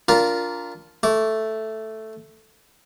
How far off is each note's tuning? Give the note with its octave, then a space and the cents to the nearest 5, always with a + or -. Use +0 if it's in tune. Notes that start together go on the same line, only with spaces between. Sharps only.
D4 -30 F4 +0 A#4 +0
A3 +0 D6 -30